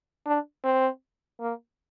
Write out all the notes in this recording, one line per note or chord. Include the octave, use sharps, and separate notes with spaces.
D4
C4
A#3